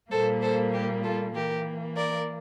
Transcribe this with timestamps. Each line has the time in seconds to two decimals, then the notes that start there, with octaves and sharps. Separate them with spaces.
0.11 A#2 G3 A#3 A4 C5
0.41 A4 C5
0.73 G4 A#4
1.03 F4 A4
1.34 E3 A#3 G4 A#4
1.96 A#4 D5